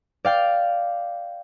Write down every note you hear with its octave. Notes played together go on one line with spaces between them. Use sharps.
D5 F5 G5